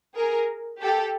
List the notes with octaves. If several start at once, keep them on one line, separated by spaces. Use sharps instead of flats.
G#4 A#4
G4 A4